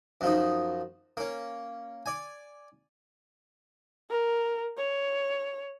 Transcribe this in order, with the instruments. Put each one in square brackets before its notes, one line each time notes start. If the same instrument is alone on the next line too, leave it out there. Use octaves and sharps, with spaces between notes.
[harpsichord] F#2 F3 D#4
A#3 C#4
D5 G#5
[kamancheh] A#4
C#5